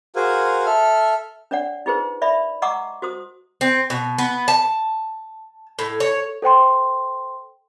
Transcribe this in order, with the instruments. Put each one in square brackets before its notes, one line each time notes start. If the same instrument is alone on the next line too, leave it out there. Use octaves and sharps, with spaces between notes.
[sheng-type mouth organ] F#4 G#4 A#4 C5 F5 G#5
A4 E5 F6
[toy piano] D4 C#5 D5 F#5
D#4 F4 G#4 B4 C5
D5 E5 B5
D#5 F#5 A#5 C#6 D6 E6
F#4 C5 D#6
[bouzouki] C4
B2
B3
A5
A2
C#5
[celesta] A4 C5 G5 C6